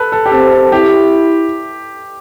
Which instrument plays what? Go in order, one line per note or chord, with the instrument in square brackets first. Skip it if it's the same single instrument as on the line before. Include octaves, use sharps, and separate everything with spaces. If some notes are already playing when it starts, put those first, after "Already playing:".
Already playing: [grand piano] A4 B4
A4
G4
[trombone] C4 [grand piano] A4
[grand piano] A4
[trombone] E4 [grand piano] G4